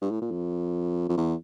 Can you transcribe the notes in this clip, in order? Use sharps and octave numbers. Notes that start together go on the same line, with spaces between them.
G2
A2
A#2
F2
F2
E2